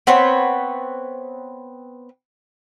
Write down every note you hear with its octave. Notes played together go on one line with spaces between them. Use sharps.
B3 C4 B4 C#5